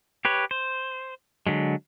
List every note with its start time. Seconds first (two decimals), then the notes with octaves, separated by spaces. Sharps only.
0.25 G4 B4 C#5
0.51 C5
1.47 D3 F#3 G#3